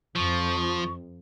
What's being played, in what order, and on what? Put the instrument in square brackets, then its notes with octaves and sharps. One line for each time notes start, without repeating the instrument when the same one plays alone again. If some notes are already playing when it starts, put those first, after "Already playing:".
[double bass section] F2 [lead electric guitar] F3 [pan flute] C#6